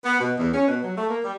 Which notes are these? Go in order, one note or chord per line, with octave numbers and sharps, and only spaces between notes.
B3
B2
E2
C#4
B2
F#3
A3
A#3
G3